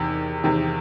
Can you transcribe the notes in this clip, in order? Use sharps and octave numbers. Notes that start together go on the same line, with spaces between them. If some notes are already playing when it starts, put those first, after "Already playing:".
Already playing: E2 C3 D#3
E2 C3 D#3